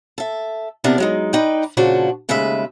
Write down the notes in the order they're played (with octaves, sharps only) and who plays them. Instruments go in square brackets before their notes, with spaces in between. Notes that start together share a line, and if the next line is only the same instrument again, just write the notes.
[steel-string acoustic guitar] A4 E5
C3 B3 D4 E4 A#4
F#3 G#3 D#4
D#4 B4 D5 G5
A#2 C#3 F3 D4 F#4
D#2 C#3 G#3 A3 B4 E5